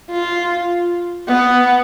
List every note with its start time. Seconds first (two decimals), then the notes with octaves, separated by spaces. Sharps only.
0.11 F4
1.28 B3